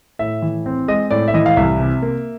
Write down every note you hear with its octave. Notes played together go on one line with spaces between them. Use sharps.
A2 E5
E3
C4
G#3 D#5
A2 D5
E5
E3 D#5
F5
C2 E5
C3
A#3